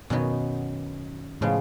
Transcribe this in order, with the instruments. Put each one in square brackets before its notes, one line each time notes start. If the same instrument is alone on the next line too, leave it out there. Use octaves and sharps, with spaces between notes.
[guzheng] F#2 D#3 F#3 B3 [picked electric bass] B2
[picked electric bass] A2 [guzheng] C#3 F3 G#3 B3